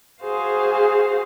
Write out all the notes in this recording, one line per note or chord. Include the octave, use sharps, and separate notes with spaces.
F#4 G#4 C5 F5